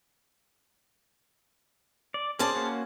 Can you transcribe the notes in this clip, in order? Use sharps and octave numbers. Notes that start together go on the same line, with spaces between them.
D5
C#4 G#4 C5 D5 A5
A#3 C#4 F#4